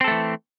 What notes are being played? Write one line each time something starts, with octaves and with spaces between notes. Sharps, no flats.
E3 A3 C4 A4